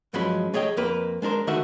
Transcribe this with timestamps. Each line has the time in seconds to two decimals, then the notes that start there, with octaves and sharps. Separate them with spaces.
0.13 G2 F3 F#3 G#3 C#4 B5
0.54 A3 G#4 C#5 D#5 G5
0.77 F2 A#3 B4
1.22 G#3 D4 A#4 C5
1.47 D2 D#3 A3 F#4 E5